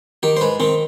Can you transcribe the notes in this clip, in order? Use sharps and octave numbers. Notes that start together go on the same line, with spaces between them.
D#3 G4
C5
G#2 B4
D#3 C4